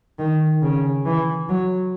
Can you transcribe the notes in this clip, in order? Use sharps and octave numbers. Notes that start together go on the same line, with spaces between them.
D#3
C#3
E3
F#3